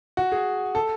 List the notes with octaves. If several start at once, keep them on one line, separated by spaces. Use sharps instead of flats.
F#4
G#4
A4